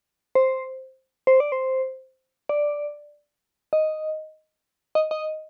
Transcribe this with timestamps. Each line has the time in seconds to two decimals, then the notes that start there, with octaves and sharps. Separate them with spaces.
0.35 C5
1.27 C5
1.40 D5
1.52 C5
2.49 D5
3.73 D#5
4.95 D#5
5.11 D#5